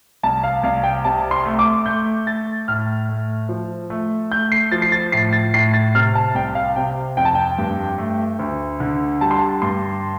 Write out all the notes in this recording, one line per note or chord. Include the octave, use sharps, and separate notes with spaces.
C2 A5
F5
C2 F5
G5
C3 A5
C6
A3
D6
A3 G6
A3 A6
A2 F6
A3
F3
A3
A3 G6
C7
F3 A6
C7
A6
A2 C7
A6
A2 C7
A6
C3 F6
A5
C2 G5
F5
C3 G5
F2 G5
A5
G5
G2
A3
D2
D3
G3 A5
C6
A5
G2 C6